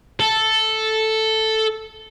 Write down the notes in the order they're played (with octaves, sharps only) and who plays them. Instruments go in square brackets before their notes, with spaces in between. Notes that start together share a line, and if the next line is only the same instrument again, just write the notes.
[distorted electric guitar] A4